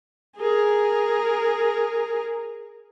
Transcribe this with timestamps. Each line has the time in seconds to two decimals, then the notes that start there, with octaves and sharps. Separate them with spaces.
0.37 G#4 A#4